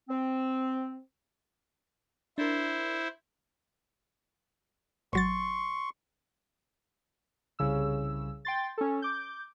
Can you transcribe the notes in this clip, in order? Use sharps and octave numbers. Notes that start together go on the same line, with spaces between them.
C4
D4 E4 A#4 C5
G#1 F#3 C6 C#6 A6
C2 C#3 E6
G5 C6 A6
C#4 A4
D6 G6